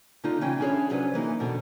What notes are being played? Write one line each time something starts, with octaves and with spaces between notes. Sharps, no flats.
D3 A#3 D#4 F4
C#3 E3 C#4 G5
C#4 D4 E4 G#4 C5 C#5
C3 F#3 C#4 D4 F4 B4
E3 A#3 D#4
F2 B2 D3